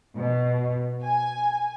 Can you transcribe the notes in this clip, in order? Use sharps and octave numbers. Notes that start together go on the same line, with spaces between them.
B2
G#5